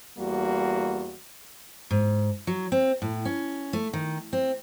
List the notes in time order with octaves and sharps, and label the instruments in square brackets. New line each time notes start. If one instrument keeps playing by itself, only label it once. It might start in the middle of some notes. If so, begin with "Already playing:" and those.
[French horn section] E2 G3 A#3 F#4
[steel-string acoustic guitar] G#2
F#3
C4
A2
C#4
A3
D#3
C4